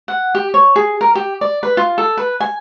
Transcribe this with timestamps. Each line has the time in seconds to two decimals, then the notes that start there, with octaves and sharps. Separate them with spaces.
0.08 F#5
0.35 G4
0.54 C#5
0.76 G#4
1.01 A#4
1.15 G4
1.41 D5
1.63 B4
1.77 F4
1.98 A4
2.17 B4
2.40 G#5